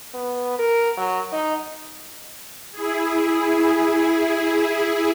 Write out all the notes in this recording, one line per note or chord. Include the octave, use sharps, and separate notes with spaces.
B3
A#4
F#3
D#4
E4 G#4